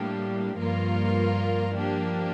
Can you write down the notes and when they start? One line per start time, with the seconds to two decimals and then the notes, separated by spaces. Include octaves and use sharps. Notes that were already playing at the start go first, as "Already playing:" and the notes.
Already playing: A2 G3 A#3 D4 G4
0.56 G2 F3 A#3 F4 A#4
1.75 F3 A#3 D4 G4